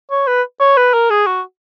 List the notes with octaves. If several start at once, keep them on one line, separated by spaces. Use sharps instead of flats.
C#5
B4
C#5
B4
A#4
G#4
F#4